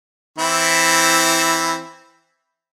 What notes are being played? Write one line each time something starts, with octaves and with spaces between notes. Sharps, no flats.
E3 C4 E4